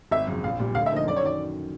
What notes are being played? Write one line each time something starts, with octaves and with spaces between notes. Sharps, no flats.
G#1 E5
F#2 C#3 F3
A#1 F5
A#2 G3
D2 F5
E5
D3 F3 A#3 D#4 D#5
F#2 D5
C#5
D#3 F#3 D5